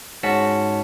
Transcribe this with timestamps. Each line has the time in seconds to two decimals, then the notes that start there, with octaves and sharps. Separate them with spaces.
0.23 G#2 C#4 F#4 A5 B6 C#7